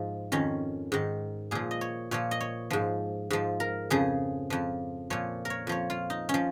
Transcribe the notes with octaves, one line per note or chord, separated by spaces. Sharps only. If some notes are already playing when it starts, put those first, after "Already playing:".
Already playing: G#2 F3
F2 D#3 C#4
G#2 D#3
A#2 F3 G#4
D#5
C#5
A#2 F3 C#5
D#5
C#5
G#2 F3
G#2 F3
A#4
F2 C#3 F3 G#4
F2 F3
A#2 F3 C#5
A#4
C#5
F2 F3 C#5
F4
D#4
C#4
F3